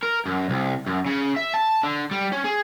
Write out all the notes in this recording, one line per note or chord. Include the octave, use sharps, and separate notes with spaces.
A#4
F#2
C2
F#2
C#3
E5
A5
D3
G3
C#4
G#4